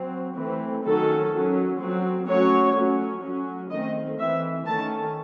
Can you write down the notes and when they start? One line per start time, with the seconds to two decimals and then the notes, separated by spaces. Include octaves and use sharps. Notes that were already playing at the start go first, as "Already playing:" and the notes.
Already playing: F#3 C4
0.36 E3 A3 C4
0.84 D#3 F#3 C#4 A4
1.32 F#3 C#4
1.79 F#3 C4
2.27 F#3 A3 C#4 C#5
2.75 F#3 A3 C#4
3.22 F#3 C#4
3.70 D#3 A3 C4 D#5
4.18 E3 C4 E5
4.66 D#3 A3 C#4 A5